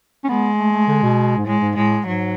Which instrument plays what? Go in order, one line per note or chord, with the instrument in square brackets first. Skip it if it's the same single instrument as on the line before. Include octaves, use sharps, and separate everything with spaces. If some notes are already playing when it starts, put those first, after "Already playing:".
[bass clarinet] C#4
[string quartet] G#3 [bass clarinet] B3
[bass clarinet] A3
A3
D3
B2
G#2
[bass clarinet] A2 [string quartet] G#3
[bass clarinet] G#2
[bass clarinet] A2 [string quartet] G#3
[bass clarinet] G#2 [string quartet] F#3